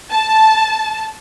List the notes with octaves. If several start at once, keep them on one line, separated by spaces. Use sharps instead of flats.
A5